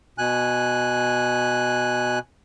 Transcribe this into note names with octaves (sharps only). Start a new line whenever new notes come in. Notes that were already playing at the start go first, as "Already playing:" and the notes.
B2 G#5 F#6